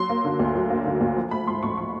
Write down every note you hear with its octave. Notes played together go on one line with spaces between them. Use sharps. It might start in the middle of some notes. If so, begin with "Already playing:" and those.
Already playing: F#3 C6
A#3
D3
D2
F#3
A#3
D3
D2
F3
A3 B5
G#2 C6
A1 C#6
F3 C#6